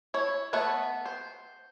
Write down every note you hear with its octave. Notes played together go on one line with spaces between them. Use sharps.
E4 C#5
A3 B3 B4 E5 F#5
C5